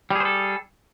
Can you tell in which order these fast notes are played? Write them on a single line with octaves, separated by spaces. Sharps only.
G3 G#4 C5 A4